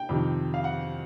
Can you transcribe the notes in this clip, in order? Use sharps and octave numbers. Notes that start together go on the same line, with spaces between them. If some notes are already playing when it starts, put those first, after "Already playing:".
Already playing: G5
F2 C3 D#3
F5
F#5